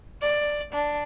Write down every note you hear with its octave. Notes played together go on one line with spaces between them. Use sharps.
D5
D4